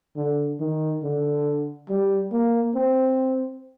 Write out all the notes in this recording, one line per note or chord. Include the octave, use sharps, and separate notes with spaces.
D3
D#3
D3
G3
A#3
C4